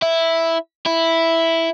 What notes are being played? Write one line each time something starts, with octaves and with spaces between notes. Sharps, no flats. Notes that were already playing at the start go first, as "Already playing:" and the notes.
E4
E4